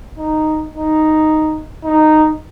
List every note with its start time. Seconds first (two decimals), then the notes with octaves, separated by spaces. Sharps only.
0.18 D#4
0.75 D#4
1.84 D#4